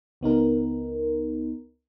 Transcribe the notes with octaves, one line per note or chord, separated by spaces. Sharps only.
C#2 B3 D#4 A#4